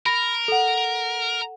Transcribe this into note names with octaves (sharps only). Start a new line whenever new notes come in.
A#4 B5 A#6
A4 F#5